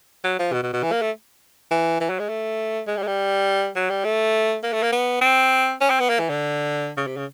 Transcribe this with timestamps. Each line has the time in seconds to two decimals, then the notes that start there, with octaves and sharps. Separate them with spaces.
0.24 F#3
0.39 F3
0.53 B2
0.63 B2
0.73 B2
0.83 E3
0.92 A#3
1.02 A3
1.71 E3
2.00 E3
2.10 F#3
2.19 G#3
2.29 A3
2.87 G#3
2.97 G3
3.02 G#3
3.07 G3
3.76 F#3
3.90 G3
4.05 A3
4.63 A#3
4.73 A3
4.83 A#3
4.92 B3
5.21 C4
5.81 C#4
5.90 C4
6.00 B3
6.09 A#3
6.19 E3
6.29 D3
6.97 C#3
7.07 C3
7.17 C#3